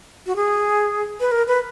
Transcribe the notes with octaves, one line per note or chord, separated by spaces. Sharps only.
F#4
G#4
B4
A#4
B4